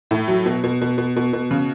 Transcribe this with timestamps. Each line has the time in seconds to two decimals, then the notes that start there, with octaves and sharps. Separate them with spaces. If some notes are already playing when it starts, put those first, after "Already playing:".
0.11 A2
0.28 F#3
0.46 B2
0.64 B2
0.81 B2
0.98 B2
1.16 B2
1.33 B2
1.51 C#3